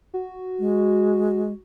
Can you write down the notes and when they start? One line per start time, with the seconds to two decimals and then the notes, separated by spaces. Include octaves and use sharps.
0.14 F#4
0.59 G#3